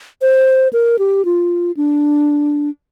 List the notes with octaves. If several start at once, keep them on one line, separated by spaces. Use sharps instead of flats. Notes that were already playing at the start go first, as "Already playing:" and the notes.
C5
A#4
G4
F4
D4